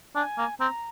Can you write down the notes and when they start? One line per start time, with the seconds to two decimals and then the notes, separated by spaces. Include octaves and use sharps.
0.15 D4 G#5
0.38 A#3
0.60 C4 A#5